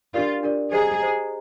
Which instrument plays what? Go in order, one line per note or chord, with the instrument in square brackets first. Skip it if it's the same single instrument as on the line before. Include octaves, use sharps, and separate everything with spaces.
[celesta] D4 G4 A#4 D5 [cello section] F4
[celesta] D4 G4 A#4 D5
[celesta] G4 C5 D#5 A#5 [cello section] G#4
[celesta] G4 C5 D#5 A#5